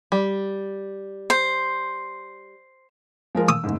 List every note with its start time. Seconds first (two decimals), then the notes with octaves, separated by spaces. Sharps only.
0.12 G3
1.30 C5
3.35 F3 G#3 A#4
3.49 D#6 E6
3.64 F#1 G#2